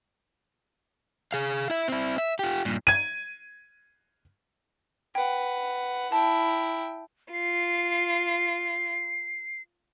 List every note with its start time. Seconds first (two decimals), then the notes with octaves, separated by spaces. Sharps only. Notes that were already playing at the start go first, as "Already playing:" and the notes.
1.33 G#4 F5
1.70 E4 E5
1.88 C4 E4
2.18 E5
2.39 F4 G4
2.65 G2 A#2
2.87 G#6 D#7
5.15 B4 F#5 G5
6.12 E4 G5 A5
7.33 F4 C7